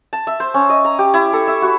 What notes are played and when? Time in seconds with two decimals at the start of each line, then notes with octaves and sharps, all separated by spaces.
0.13 A5
0.27 E5
0.40 C5
0.54 C#4
0.70 D#5
0.85 A#5
0.99 G4
1.14 E4
1.33 A4
1.48 E5
1.62 F#4